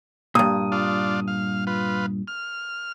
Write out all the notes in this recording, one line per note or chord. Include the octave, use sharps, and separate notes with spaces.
G2 A#2 D#6
D4 F4
F5
F4 B4
F6